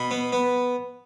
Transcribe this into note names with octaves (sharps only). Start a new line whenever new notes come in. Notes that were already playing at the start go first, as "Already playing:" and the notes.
Already playing: B2 B5
B3
B3